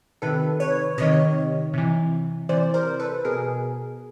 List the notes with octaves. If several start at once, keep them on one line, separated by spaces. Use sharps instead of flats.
C3 D#3 A4 B4
B4 C#5
C3 D#3 C#5 D#5
C3 E3
C3 E3 C5 D5
A#4 C5
A4 B4
B2 G#4 A#4